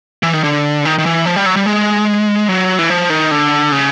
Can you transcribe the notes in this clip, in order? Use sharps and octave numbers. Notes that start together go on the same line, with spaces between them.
E3
D#3
D3
D#3
D#3
E3
F3
G3
F#3
G3
G#3
F#3
E3
F3
D#3
D3
C#3